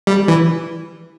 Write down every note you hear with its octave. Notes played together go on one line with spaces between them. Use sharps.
G3
E3